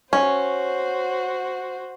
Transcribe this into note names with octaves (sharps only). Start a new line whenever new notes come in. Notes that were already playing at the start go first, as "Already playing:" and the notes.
C#4 F#4 C5